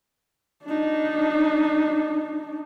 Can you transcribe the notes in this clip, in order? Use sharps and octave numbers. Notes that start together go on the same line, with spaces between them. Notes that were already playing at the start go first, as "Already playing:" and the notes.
D4 D#4